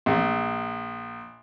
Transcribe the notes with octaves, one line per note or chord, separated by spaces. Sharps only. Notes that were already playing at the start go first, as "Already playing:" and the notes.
A#1